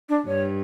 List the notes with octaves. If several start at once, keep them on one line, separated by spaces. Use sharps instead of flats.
D4
G2 C#5